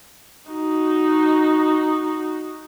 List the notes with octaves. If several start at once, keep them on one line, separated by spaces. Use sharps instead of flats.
D#4 F#4